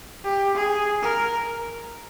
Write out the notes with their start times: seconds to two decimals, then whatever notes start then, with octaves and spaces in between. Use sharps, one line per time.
0.24 G4
0.55 G#4
1.02 A#4